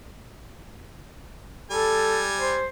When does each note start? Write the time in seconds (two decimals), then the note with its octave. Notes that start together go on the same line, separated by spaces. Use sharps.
1.71 G3 A4 G#5
2.40 C5